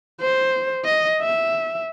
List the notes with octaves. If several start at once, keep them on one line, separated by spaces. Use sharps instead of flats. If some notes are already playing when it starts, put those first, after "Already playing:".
C5
D#5
E5